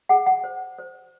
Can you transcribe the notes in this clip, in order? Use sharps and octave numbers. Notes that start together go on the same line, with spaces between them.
G#4 F#5
F#5
C5
C5